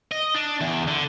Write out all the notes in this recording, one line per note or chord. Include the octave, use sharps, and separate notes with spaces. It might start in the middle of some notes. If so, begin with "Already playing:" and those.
D#5
D4
E2
D3